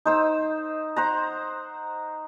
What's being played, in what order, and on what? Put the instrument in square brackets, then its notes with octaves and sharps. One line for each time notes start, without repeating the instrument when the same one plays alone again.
[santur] D#4 C5 E6
C5 F#5 A#5